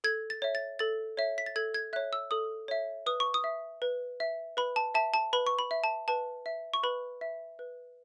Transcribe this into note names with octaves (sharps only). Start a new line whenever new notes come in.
A4 G#6
A6
C#5 E5
A6
A4 A6
C#5 E5
B6
A6
A4 G#6
G#6
C#5 E5 F#6
E6
A4 D#6
C#5 E5
B4 D#6
C#6
D#6
E5
B4
E5
B4 B5
A5
E5 A5
A5
B4 B5
C#6
B5
E5
A5
B4 A5
E5
C#6
B4 B5
E5
B4